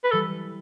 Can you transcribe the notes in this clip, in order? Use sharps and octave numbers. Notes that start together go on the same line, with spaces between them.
B4
E3 G3 A4